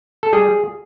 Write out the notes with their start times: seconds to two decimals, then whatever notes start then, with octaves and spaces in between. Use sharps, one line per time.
0.23 A4
0.33 G3 G#4